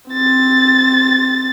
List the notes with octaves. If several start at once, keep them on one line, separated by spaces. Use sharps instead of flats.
C4 A6